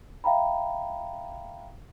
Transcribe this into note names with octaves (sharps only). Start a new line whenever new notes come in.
E5 F5 G5 A#5 B5